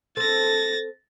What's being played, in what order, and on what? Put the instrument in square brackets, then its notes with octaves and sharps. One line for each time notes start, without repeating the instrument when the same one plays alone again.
[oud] C4 A4 [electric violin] A6 A#6